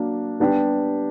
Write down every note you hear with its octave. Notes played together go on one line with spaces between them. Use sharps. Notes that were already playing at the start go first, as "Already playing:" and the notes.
Already playing: F#3 A#3 D4
G3 B3 D4 G4